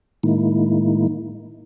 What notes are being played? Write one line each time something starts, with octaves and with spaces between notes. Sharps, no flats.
A2 D#3 G#3 A#3 D#4 E4